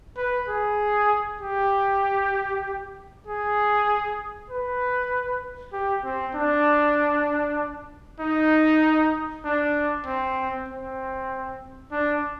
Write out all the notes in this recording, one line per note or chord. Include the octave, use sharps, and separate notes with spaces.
B4
G#4
G4
G#4
B4
G4
C4
D4
D#4
D4
C4
C4
D4